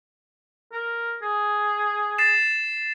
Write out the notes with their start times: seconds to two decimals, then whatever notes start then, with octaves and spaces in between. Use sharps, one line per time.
0.72 A#4
1.22 G#4
2.18 A6 C7 E7